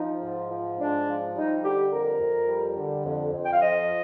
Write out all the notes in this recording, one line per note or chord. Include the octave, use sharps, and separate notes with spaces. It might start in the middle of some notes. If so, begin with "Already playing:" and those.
Already playing: F3 D#4
G#2
F3
G#2 D4
F3
G3 D#4
D3 G4
F2 A#4
F2
G3
D3
F2
F2
G5
F5
F3 D#5